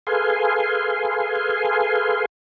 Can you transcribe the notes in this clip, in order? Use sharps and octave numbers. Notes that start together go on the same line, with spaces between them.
G#4 A4 B4 F5 G#5 C6